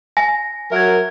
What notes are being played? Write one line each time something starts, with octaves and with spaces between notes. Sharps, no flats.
G#5 A#6
F#3 A#4 E5 G#6